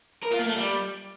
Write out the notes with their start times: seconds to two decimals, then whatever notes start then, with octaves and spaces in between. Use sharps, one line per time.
0.23 A#4
0.31 F4
0.39 A#3
0.48 A3
0.56 G3